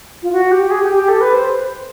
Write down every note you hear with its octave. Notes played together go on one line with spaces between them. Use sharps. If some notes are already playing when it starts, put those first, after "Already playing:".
F4
F#4
G4
G#4
G4
G4
A4
B4
C5